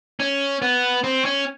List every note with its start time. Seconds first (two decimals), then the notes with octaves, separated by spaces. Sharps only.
0.20 C#4
0.62 B3
1.04 C4
1.25 C#4